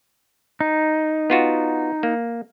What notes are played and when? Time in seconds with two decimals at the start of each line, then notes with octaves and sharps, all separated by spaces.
0.61 D#4
1.30 B3 F4 F#4
2.03 A#3